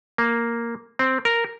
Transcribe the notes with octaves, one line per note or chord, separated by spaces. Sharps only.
A#3
C4
A#4